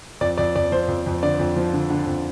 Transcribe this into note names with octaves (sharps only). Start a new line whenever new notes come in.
F2 D5
F2 D5
F2 D5
F3 C5
F2
F2
D3 D5
F2
F3
D3
D3
F2